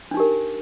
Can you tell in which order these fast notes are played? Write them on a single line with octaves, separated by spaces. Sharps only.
D4 D#4 G4 A#4